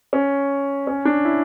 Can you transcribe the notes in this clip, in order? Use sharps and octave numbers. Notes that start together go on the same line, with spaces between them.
C#4
C#4
D4
E4